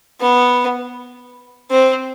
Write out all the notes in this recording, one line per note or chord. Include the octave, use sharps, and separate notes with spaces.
B3
C4